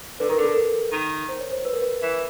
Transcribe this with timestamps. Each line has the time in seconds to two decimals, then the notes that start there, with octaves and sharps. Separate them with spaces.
0.20 D3 B4
0.29 D#3 A#4
0.37 D3
0.44 A4
0.56 A#4
0.92 D#3
1.29 C5
1.40 C#5
1.51 C5
1.65 B4
1.73 A#4
1.82 B4
2.02 E3